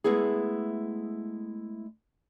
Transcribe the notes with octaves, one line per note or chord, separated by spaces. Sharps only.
G#3 A3 B3 E4 G#4